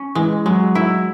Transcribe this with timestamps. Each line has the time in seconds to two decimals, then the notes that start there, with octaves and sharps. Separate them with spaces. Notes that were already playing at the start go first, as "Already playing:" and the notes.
Already playing: C#4
0.15 E3 G#3
0.46 F#3 G#3
0.75 E4